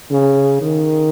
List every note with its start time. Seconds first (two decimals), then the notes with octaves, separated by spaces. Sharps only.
0.11 C#3
0.62 D#3